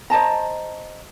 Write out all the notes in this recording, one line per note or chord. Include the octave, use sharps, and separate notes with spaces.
C5 D#5 A5 A#5